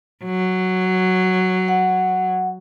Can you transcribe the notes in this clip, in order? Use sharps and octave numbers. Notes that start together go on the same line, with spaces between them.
F#3
F#5